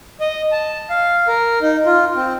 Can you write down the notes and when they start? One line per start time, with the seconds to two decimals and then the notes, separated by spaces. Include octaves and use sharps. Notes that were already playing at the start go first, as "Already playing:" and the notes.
0.20 D#5
0.52 A5
0.90 F5
1.28 A#4
1.61 D#4
1.86 F4
2.16 C4